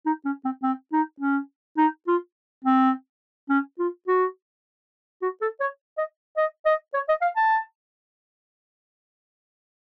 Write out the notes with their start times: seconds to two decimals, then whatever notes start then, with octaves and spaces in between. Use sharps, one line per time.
0.06 D#4
0.25 C#4
0.44 C4
0.63 C4
0.92 D#4
1.20 C#4
1.78 D#4
2.07 F4
2.65 C4
3.50 C#4
3.79 F4
4.08 F#4
5.22 F#4
5.41 A4
5.61 C#5
5.98 D#5
6.37 D#5
6.66 D#5
6.94 C#5
7.09 D#5
7.22 F5
7.37 A5